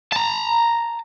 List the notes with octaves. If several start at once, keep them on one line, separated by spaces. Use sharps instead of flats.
A5 A#5